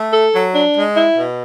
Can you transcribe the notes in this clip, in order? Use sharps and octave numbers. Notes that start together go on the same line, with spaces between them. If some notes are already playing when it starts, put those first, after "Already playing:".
Already playing: A3
A4
F#3
D4
G#3
E4
B2